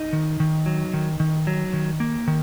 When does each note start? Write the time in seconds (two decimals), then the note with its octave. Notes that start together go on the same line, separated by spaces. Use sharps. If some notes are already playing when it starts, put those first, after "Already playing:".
Already playing: D#4 D#5
0.13 D#3
0.40 D#3
0.66 F#3
0.94 D#3
1.20 D#3
1.47 F#3
1.73 D#3
2.00 A#3
2.28 D#3